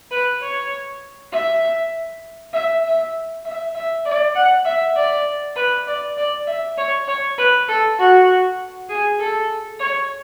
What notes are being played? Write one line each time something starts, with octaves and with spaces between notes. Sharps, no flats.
B4
C#5
E5
E5
E5
E5
E5
D5
F#5
E5
D5
B4
D5
D5
E5
C#5
C#5
B4
A4
F#4
G#4
A4
C#5